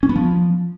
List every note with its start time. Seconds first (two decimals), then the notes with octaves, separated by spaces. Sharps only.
0.03 C#4
0.09 B3
0.16 F3